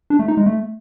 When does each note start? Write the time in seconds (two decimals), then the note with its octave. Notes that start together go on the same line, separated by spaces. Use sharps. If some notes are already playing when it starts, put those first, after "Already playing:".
0.10 D4
0.19 A3
0.28 D#4
0.37 G#3
0.46 A3